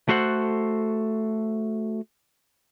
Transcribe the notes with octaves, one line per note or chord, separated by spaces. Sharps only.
A3 F#4 A4 C5 F#5